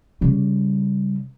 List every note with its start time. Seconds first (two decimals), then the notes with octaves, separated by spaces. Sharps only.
0.21 C#3 G3